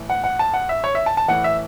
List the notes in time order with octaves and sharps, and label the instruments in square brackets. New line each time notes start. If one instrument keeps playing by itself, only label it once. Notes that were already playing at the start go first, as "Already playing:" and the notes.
Already playing: [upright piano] A2 E3
F#5
F#5
A5
F#5
E5
C#5
E5
A5
A5
A2 E3 F#5
E5